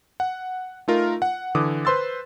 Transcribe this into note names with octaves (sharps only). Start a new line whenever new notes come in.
F#5
A3 D#4 F4 A#4
F#5
D3 E3 D6 D#6
B4 C5 C6 E6 A6